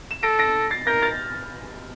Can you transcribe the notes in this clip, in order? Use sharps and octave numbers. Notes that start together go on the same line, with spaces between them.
E7
A4 A#6 D7
A#6 D7
A6 C7
A#4 G6 A#6
F6 A6